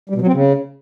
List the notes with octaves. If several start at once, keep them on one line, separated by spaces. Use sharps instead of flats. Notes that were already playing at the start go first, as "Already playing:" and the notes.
G3
B2
F#3
C4
C#3